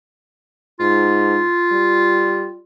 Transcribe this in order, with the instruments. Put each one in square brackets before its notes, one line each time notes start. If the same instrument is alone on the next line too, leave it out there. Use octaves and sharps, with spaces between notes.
[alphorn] G#2 [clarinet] F4
[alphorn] G3